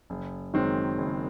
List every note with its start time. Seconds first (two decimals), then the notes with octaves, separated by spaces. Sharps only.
0.10 F#1
0.54 F#2 D#3 G#3 C4
0.98 F#1